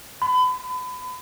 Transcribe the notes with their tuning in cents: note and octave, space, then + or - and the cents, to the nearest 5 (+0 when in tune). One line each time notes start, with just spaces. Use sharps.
B5 +30